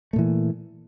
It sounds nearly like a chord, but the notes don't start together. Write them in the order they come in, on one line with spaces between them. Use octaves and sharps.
A3 A#2 E3